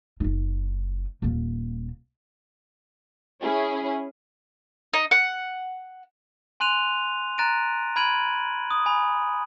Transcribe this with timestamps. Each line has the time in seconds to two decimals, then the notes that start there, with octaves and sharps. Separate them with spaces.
0.20 F#1 D#4
1.22 D#1 A#3
3.42 C#4 E4 G#4
4.94 D#4
5.11 F#5
6.60 G#5 C6 F#6 D#7 F7
7.38 A#5 F#6 A6 A#6 D7 D#7
7.96 B5 F6 G#6 D7 D#7 F#7
8.71 D#6
8.86 G#5 B5